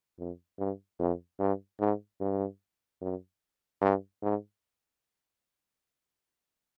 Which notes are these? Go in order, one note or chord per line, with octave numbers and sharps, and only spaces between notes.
F2
G2
F2
G2
G#2
G2
F#2
G2
G#2